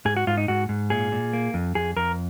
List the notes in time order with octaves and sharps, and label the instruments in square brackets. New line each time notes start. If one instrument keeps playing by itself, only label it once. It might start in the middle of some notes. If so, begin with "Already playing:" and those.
[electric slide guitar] G#2 G#4
F#4
G#2 F4
D#4
G#2 F#4
G#2
A#2 G#4
A#2
A#3
F2
F2 G#4
F2 A#4